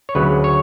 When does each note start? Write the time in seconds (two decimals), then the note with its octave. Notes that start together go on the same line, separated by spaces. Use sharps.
0.09 C#5
0.15 D2 C#3 F#3 B4
0.44 C#5